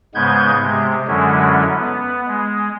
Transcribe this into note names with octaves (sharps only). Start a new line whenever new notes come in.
G#2 C#3 G#3 B3 G6 G#6
C3 G#3
F#2 D3 F#3 G#3 C#4 E4
B3
G#3